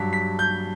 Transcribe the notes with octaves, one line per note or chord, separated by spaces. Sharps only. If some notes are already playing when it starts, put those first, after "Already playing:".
Already playing: G2 F#3 B6
B6
G6